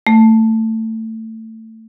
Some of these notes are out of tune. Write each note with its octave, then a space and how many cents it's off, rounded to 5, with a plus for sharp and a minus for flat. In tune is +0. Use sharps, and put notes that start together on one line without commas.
A3 +20